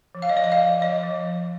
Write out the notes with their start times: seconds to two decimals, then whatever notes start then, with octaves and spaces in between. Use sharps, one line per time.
0.15 F3
0.22 F5
0.29 D#5
0.37 F3 D5
0.44 D#5
0.52 F5
0.58 F3
0.81 F3 D#5
1.03 F3